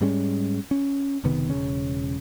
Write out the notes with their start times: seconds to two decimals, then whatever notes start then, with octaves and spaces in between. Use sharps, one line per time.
0.01 G#2 G3 G#3 C#4
0.71 C#4
1.24 F#1 C3 D#3 B3
1.50 E1 C#2 C#3 C#4